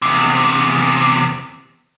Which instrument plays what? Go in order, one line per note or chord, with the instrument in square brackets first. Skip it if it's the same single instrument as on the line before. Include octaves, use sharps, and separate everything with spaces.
[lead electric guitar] E2 C3